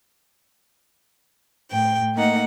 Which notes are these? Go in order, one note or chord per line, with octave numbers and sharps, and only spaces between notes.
A2 G5
A3 A#3 D#4 F#5